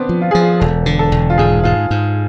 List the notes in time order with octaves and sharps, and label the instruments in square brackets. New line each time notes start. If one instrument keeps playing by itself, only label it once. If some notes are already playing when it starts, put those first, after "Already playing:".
Already playing: [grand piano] B3 C4 D4
[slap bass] F3
[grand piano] F4
[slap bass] F3 [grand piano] G#4
[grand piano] F4
[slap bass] E1 [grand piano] A4
[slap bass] D3
[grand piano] A4
[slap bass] E1
[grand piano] F4
[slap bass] G#2 [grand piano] G#4
[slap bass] G#2 [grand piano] F4
[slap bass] G#2